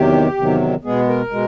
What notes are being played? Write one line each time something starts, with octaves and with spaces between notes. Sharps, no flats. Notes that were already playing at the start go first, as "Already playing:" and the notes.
Already playing: E2 C3 D#3 F#3 G4
E2 C3 D#3 F#3
B2 G#3 B3 G#4
A#4
B2 G#3